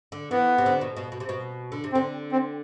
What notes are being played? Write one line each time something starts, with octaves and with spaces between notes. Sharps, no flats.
D3
E3 B3
C3
D3
B2
B2
B2
C3
B2
D3
C3
C4
D3
C4